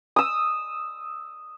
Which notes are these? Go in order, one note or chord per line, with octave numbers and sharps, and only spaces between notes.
D#6 E6